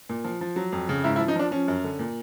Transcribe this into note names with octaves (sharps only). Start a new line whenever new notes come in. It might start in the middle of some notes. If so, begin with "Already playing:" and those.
A#2
F3
F3
F#3
F2
C#3
G#2 E4
E4
F3
D#4
F3 D4
F3 C#4
F#2
D3
A#2